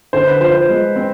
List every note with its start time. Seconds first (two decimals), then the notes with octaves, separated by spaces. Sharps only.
0.13 D3 C5
0.27 B4
0.40 F3 C5
0.54 C5
0.69 G#3
0.96 C4